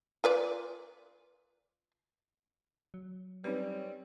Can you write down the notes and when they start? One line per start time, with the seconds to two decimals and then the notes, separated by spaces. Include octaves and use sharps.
0.24 F4 B4 D5
2.94 F#3
3.44 G3 C4 C#4 D#4 B4